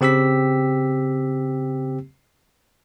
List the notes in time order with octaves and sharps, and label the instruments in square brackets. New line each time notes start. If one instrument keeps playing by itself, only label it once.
[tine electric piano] C#3 C4 G4 E6 B6